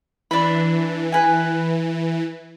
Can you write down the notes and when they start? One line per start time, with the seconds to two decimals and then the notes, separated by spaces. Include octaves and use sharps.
0.31 E3 D4 B5
1.12 B4 G#5